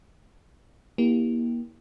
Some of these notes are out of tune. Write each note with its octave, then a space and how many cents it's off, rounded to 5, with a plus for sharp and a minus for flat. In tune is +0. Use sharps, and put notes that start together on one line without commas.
A#3 +30 E4 -30 G4 +0